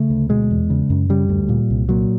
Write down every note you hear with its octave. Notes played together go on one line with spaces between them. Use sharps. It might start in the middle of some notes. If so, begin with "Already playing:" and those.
Already playing: C#3 A3
D2
B2 G#3
E2
C#3
F#2
C#3 G3
D2
A#2
C2
A#2 F#3